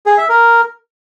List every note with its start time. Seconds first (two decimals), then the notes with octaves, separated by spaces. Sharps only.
0.06 G#4
0.18 E5
0.29 A#4